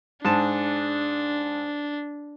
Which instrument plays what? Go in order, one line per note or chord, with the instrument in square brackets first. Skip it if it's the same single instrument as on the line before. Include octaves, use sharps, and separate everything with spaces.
[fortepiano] G#2 A5 [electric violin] D4